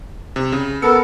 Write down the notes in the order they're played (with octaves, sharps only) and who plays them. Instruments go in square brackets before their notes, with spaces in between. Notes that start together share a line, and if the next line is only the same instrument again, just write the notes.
[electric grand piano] C3
C#3
[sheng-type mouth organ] B3 A4 [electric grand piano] A#4 E6 C#7